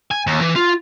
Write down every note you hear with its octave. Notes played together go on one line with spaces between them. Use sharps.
G#5
D#2
E3
F4